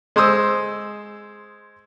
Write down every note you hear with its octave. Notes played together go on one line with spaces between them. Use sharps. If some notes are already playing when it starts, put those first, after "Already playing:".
G#3 C5 D#6 E6